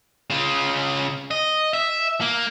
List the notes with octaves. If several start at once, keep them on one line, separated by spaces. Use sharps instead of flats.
C#3 F4
D#5
E5
A#3